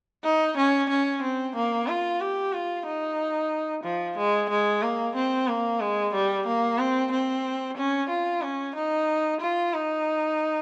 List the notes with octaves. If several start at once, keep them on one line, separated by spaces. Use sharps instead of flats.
D#4
C#4
C#4
C4
A#3
F4
G4
F4
D#4
F3
G#3
G#3
A#3
C4
A#3
G#3
G3
A#3
C4
C4
C#4
F4
C#4
D#4
F4
D#4